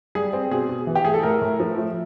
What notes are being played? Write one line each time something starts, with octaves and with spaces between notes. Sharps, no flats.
G3 G#4
C4
B2 G#4
B2
E3
G4
A3 G#4
A4
A2 A#4
A2
F3
A3